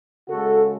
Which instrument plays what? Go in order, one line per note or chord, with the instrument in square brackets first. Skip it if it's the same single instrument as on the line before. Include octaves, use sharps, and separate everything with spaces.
[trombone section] C#3 G#3 F#4 A4